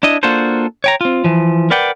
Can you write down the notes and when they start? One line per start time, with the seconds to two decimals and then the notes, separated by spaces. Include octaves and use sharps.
0.03 D4 E4 D#5
0.23 A#3 D4 F4 F#4 A4 C5
0.84 C#5 G5 A#5
1.01 C4 F4
1.24 E3 F3
1.71 A#4 B4 D5 F#5 G5